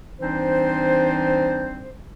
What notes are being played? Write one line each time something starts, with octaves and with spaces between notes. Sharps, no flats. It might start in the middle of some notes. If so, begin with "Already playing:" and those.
E3 G3 C4 D4 D#4 C5